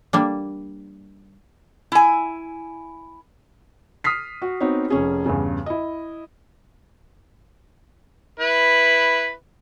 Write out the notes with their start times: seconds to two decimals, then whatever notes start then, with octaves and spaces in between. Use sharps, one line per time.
0.13 G3 A#3 D4
1.92 E4 G#5
4.04 D#6 F6 B6 C7
4.42 F#4
4.60 B3 C4 D#4 F#4 C#5
4.90 F1 C#4 G#4
5.26 E2 G2 C#3
5.66 E4 D#5
8.40 E4 B4